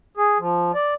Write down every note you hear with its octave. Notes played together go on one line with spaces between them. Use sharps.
G#4
F3
D5